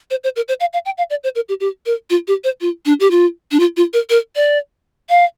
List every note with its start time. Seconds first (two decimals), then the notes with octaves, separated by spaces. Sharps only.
0.11 C5
0.24 C5
0.36 A#4
0.48 C5
0.60 F5
0.73 F5
0.85 G5
0.98 F5
1.10 D5
1.24 C5
1.35 A#4
1.49 G4
1.60 G4
1.86 A#4
2.10 F4
2.28 G4
2.44 C5
2.61 F4
2.86 D4
3.00 G4
3.11 F4
3.51 D4
3.60 F4
3.77 F4
3.93 A#4
4.10 A#4
4.36 D5
5.10 F5